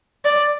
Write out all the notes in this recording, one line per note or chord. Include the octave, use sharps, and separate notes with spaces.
D5